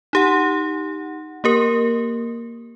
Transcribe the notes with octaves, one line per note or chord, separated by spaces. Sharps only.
D#4 G4 F#5
A#3 G4 A#4